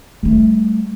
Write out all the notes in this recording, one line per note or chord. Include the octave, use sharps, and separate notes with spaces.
G3 A3